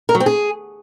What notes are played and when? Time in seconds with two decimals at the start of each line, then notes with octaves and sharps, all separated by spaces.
0.09 A#4
0.15 F#3
0.20 C4
0.26 G#4